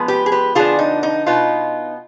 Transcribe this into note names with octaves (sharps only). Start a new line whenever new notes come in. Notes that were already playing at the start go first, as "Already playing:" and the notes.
Already playing: F3 G#3 B3
G4 B4
G#4
G4 B4
D3 F3 B3 D4 F4 G#4
D#4
D#4
B2 B3 D#4 F4